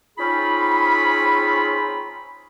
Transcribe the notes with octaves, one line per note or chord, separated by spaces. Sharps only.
C4 C#4 D#4 F4 G#4 B5